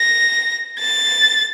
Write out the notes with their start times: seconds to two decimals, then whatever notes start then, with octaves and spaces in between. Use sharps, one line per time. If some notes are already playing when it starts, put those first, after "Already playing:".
Already playing: A#6
0.80 A6